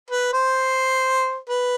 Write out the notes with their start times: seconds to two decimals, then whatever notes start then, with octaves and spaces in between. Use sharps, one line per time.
0.11 B4
0.33 C5
1.49 B4